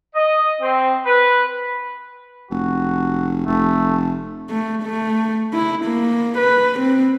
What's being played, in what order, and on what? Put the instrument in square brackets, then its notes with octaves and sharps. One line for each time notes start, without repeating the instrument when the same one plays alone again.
[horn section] D#5
C4
B4
[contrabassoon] F1 [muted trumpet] F#4
[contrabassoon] F1 [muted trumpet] A3
[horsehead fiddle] A3
A3
E4
A#3
B4
C4